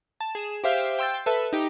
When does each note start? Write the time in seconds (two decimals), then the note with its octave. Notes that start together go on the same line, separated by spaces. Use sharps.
0.21 A5
0.35 G#4 E7
0.64 G4 C5 E5 F5 G5
0.99 G5 C6 E6 G6 A6
1.26 A4 B4 E5 A5
1.53 D#4 G4